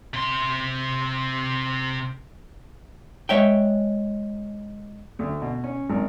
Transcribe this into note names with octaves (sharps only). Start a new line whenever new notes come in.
C3 C6
G#3 C#5 E5 G5
D2
B2
C#4
G#1